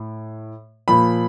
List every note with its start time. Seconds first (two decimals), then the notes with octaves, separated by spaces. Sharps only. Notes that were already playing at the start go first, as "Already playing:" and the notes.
Already playing: A2
0.88 A#2 F3 B5